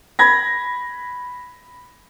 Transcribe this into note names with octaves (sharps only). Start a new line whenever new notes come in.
B5 G#6 A#6